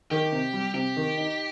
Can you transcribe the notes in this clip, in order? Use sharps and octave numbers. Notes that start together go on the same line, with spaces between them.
D#3 G4
C3
G3
C3 G4
D#3
D#4